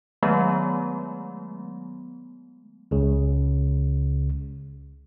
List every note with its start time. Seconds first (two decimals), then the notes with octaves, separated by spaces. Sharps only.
0.23 D#3 F#3 G#3 A3 B3
2.91 C#2 C#3